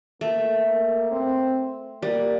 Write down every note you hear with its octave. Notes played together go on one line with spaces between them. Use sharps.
A3 A#3
A#3
C4
G3 A#3